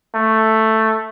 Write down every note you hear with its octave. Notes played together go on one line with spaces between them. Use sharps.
A3